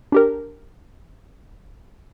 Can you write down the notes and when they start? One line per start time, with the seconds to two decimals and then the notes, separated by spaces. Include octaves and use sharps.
0.12 D4 G4 A#4